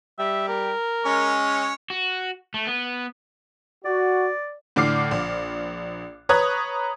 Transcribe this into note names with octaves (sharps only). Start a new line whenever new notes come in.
G3 E5
A#4
G#3 C#4 C#5 C#6
F#4
A3
B3
F#4 D5
A2 D3 D4 D6 F6 C7
A#1
B4 C#5 A#5 D#6 F#6 G#6